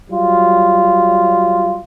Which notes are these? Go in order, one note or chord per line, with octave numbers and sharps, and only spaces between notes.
F#3 G3 F4